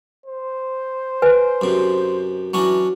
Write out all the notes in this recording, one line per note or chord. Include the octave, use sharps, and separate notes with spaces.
C5
B4 G#5
F#2 C3
E3 F#3 C#4 D4